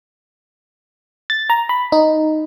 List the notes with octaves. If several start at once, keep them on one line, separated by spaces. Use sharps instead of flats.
A6
A#5
B5
D#4